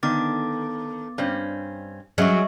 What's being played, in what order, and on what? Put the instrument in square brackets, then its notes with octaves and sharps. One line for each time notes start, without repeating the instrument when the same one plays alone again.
[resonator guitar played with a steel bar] D3 D#3 [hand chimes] B3 D6 A6
[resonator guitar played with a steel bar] G2 C4 C#4
[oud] F#3 [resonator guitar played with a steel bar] C#4 G#4 [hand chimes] D#5 E5 C#6